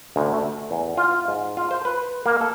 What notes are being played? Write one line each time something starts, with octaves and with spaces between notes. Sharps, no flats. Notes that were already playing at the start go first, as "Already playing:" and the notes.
D2
A3
E2
F4
G#2
F4
C5
B4
A#3
A4